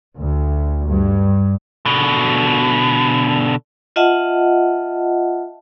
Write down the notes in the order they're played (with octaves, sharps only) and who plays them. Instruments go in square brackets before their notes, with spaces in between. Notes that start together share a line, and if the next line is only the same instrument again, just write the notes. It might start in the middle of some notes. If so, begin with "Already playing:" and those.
[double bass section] D2
G2
[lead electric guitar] B2 D3
[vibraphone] F4 D#5 E5 F#5 A5